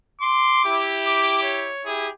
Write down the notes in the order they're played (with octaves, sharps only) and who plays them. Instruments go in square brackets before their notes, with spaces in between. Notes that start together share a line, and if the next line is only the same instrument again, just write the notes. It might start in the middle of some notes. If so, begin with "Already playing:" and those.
[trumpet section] C6 [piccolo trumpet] D6
[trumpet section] E4 G4
[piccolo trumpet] D6
C#5
[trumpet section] E4 G4 G#4